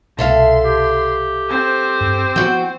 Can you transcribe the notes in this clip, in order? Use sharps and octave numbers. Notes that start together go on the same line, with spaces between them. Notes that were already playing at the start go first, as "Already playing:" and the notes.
C2 B2 A4 E5 F5 C6
G4
C4 C5
G2
F3 B3 F#4 G5